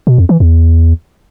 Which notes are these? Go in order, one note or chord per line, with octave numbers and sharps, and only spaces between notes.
B2
F2
E3
E2